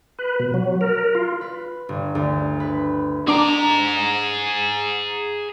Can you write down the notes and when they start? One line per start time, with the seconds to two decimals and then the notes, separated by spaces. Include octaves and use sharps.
0.19 B4
0.40 B2
0.54 F#3
0.81 A#4
1.15 F4
1.41 B4
1.89 G1
2.15 D2
2.60 B4
3.28 D4 G#4 A#5 D6